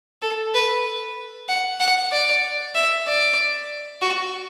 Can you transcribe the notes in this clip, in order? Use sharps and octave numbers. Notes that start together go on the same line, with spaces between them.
A4
B4
F#5
F#5
D5
E5
D5
F#4